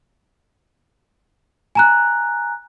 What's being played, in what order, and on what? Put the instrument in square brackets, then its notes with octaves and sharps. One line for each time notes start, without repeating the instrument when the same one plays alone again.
[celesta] G#5 A#5 F#6